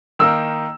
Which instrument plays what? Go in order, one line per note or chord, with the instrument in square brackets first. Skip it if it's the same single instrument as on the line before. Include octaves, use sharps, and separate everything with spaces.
[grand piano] D#3 A#3 D#4 A#4 [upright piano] E6